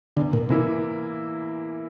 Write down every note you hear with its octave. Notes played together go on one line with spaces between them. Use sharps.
E2 D3
A#2
C3 E3 A#3 E4